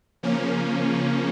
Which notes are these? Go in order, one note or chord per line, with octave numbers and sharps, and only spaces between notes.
C#3 F3 A#3 C#4